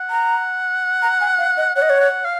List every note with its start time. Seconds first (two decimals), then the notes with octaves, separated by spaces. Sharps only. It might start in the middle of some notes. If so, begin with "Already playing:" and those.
Already playing: F#5
0.10 A#5
1.02 A#5
1.21 G#5
1.38 F5
1.57 D#5
1.76 C#5 F#5
1.82 D#5
1.90 C#5
2.00 F#5
2.25 F5